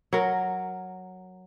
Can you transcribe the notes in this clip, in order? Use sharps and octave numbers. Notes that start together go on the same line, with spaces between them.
F#3 A#4